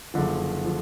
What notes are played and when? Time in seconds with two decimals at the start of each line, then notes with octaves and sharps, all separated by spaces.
0.14 F#1 F#2 D3 F3
0.64 D3 F3